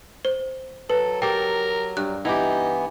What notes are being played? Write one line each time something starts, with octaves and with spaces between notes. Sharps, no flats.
C5
F#3 A4 B4
G4 A4 A#4 G5
G2 F#6
E3 B3 D#4 E4 G4